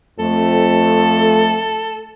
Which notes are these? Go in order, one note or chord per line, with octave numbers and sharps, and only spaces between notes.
F2 A3 A4